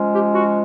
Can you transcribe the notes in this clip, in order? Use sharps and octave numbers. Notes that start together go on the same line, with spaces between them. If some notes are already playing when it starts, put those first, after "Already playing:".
Already playing: F3 G#3 C#4
G4
F#4